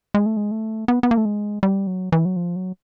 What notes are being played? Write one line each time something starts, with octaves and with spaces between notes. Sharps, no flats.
G#3
A3
G#3
A3
B3
B3
A#3
A3
G#3
G3
F#3
E3
F#3
F3
F#3